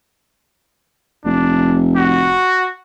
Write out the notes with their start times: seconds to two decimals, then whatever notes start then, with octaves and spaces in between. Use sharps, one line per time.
1.25 F1 D4
1.96 F#4